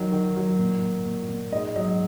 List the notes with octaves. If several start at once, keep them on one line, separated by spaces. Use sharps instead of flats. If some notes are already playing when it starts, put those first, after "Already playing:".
Already playing: D#3 F#3
D#3
F#3
A#2
A#2
A#2
A#2
G#2 D#5
F#3 D#5